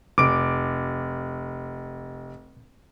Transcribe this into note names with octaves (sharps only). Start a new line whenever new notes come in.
F1 D6 D7